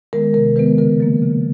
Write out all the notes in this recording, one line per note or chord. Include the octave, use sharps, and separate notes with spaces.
D#3 G#3 B3 A#4
C3 A#4
D#3 G#3 B3 B4
C#3 A#4
F3 A#3
C#3